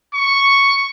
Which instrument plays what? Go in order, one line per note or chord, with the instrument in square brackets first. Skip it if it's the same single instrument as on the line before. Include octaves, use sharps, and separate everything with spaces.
[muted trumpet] C#6